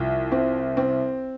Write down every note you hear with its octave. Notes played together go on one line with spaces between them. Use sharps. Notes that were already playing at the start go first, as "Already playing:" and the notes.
Already playing: C2 F3
C4
C4